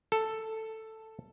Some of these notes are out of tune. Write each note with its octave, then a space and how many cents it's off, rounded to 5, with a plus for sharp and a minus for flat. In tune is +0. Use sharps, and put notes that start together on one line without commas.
A4 +5